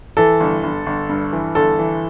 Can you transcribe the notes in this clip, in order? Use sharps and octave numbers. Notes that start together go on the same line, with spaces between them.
E3 A4
G1
G1
G1
G2
E3
G1 A4
E3